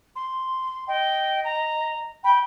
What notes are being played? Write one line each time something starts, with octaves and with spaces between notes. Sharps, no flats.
C6
D#5 G5
A#5
G5 B5